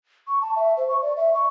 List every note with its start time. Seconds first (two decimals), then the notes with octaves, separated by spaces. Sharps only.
0.27 C#6
0.42 A5
0.56 E5
0.77 C5
0.89 C#6
1.02 D5
1.17 E5
1.34 C#6